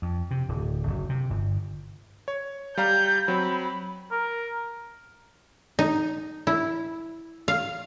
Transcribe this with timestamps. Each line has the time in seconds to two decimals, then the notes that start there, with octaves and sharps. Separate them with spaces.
0.02 F2
0.31 C3
0.49 D1
0.87 F#1
1.09 C3
1.30 G1
2.28 C#5
2.77 G3 F5 A#5 G6
3.28 F#3 C4 B5
4.11 A#4
5.79 D#4
6.47 E4
7.48 F5